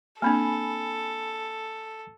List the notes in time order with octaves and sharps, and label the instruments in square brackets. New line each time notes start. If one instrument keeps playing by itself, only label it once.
[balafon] A#3 C4 D4 [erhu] A4 [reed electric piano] G#5 B5